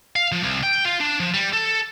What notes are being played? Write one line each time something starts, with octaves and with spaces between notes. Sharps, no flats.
F5
F3
C2
G5
F4
D4
F3
G3
A4